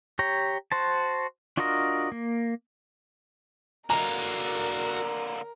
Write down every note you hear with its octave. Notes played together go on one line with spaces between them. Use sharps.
G4 C#5 A#5
F#4 C5 A5
D4 F4 F#4 A#4 D#5
A#3
D3 A#3 F#4 A#4 F5 A#5